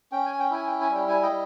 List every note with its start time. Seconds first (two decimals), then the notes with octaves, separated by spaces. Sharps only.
0.12 C#4 G5
0.26 G#5
0.39 G5
0.51 E4 G#5
0.67 G5
0.81 G#5
0.90 G3 G5
1.08 G#5
1.23 D#5 G5
1.29 G3